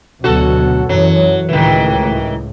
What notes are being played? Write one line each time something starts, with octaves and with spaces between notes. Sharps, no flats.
D2 B2 F#3 F#4 A4
F#2 E3 F#3
C#2 A2 D#3 E3